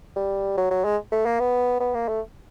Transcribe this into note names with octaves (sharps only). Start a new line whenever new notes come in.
G3
F#3
F#3
G#3
A3
A#3
B3
B3
A#3
A3